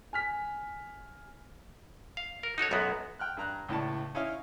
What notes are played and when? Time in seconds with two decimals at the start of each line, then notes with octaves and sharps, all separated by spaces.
0.13 G#5 F6 B6
2.17 F5
2.43 A#4
2.58 D#4 F#4 A4 C#5
2.71 B1 F#2 G#3 B3 F#4
3.19 G5 F6 F#6
3.37 G2 A#5 F#6
3.69 C#2 A2 D5 A5
4.15 C#4 D#4 E4 C#5 D#5 F5